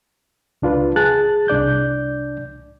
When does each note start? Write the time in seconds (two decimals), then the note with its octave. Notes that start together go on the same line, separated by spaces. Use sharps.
0.62 C#2 D4 F4 B4
0.96 G#4 A5 F#6 A6
1.48 C2 D4 D5 G6